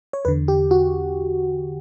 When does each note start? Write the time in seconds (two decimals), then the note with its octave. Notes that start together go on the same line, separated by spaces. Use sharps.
0.13 C#5
0.25 E2 D3 B4
0.48 G4
0.71 F#4